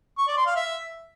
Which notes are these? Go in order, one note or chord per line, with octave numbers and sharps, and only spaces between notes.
C#6
D5
C6
F5
E5